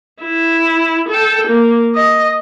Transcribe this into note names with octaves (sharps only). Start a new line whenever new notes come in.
E4
A4 G5
A#3
D#5